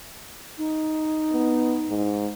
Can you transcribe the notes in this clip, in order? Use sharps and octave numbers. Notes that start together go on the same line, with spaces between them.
D#4
B3
G#2